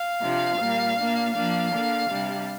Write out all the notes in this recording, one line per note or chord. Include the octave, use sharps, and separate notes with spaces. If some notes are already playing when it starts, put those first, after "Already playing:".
Already playing: F5
C3 F3 D4
A#2 G3 A#3
A#2 A#3 D4
F3 A#3 D4 F5
D3 A#3 D4
C3 G3 D4